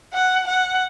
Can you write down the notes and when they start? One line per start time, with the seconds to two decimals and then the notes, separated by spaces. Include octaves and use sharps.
0.13 F#5
0.47 F#5